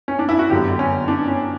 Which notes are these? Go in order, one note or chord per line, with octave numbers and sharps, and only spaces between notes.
C#4
D4
E4
F#4
G1 F#2 D3 G4
C#4
D4
C#4